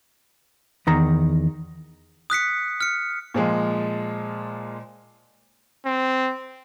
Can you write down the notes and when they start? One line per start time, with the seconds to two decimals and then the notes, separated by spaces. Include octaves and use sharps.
0.87 E2 D#3 A#5
2.30 D#6 F#6 B6 C#7
2.81 F6 C#7
3.34 A#2 F3 G#3
5.86 C4